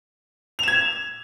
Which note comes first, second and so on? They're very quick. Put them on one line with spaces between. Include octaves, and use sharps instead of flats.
F7 E7 G#6